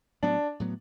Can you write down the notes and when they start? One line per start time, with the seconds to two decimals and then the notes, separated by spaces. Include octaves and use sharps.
0.23 A2 F#3 B3 D4
0.60 A2 F#3 B3